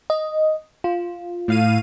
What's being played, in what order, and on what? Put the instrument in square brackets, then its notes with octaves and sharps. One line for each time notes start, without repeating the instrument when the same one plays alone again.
[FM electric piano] D#5
F4
[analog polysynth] A2 F5 D#7